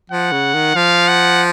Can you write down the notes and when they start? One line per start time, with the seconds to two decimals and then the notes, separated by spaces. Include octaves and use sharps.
0.10 F3 F#5
0.32 C#3
0.54 D#3
0.75 F3 F5
1.08 F#5